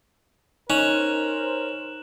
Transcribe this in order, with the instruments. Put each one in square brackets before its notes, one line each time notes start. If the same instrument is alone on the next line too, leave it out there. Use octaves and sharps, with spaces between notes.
[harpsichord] C#4 [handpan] D#4 [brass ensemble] A#4 C5 [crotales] F#6 E7 F#7